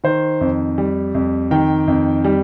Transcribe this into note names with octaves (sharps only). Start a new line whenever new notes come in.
D#3 C5
F2
G3
F2
D#3 G5
F2
G3